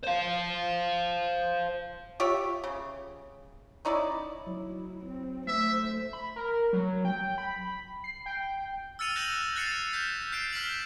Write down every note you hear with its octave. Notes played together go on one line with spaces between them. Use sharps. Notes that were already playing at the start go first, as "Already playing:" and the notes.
C5 F5
F4 G4 C#5 E5
C#3
C#4 D#4 E4 D5
F#3 E4 C#5
C4
A3 C5 E5
B5
A#4
F#3
G5
B5
C7
G5
E6 F6 A6 C#7 D#7 F7
F#6 G6 A#6 D#7 E7 F#7
F#6 A6 C7 C#7 F7
F6 G6 B6 E7
F6 G6 C7 D7
F6 B6 E7 F#7